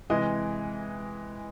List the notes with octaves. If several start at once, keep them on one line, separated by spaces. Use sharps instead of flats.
C3 E3 G#3 D#5